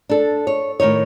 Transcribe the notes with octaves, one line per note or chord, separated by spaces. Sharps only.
D4 A4
C#5
A2 D#3 D#4 C#5